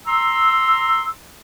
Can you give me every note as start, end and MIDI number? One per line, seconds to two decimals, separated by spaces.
0.07 1.10 82
0.07 1.10 84
0.07 1.10 88